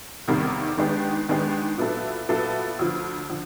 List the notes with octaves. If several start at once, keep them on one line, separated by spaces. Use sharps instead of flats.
E2 C3 D#3 G3 A#3
D#3 G#3 B3 D4 G4
D#3 G#3 B3 D4 G4
A#2 F#3 B3 E4 A4
A#2 F#3 B3 E4 A4
D2 D3 F3
D3 F3